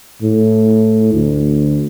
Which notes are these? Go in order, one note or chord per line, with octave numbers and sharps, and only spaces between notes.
A2
D2